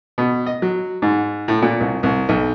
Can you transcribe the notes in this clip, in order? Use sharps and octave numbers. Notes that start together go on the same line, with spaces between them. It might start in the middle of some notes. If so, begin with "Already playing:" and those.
B2
D#5
F#3
G#2
A2
A#2
C2
C2
B1